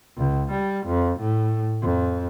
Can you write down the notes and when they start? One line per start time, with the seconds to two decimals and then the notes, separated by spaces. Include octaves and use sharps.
0.16 C#2
0.51 G3
0.86 F2
1.20 A2
1.82 F2